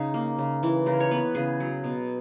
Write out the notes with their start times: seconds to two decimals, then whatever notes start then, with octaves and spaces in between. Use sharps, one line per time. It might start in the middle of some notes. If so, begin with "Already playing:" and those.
Already playing: C#3 D#4
0.14 A#3
0.38 C#3
0.63 E3
0.86 C#3 A#4
1.00 C#5
1.11 B3 B4
1.35 C#3 G#4
1.60 F#3
1.84 B2